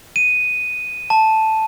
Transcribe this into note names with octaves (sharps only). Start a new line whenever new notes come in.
D#7
A5